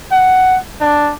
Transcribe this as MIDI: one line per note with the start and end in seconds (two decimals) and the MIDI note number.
0.12 0.58 78
0.81 1.12 62